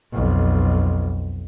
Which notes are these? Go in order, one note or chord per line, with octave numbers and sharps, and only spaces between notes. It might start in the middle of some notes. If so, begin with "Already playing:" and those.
B1 F2